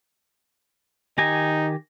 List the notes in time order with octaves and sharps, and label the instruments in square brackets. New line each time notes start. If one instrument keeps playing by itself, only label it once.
[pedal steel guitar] D#3 G4 G#5 [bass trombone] D#4 [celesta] A#6